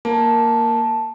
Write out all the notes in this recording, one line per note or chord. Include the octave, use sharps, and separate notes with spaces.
A#3 A5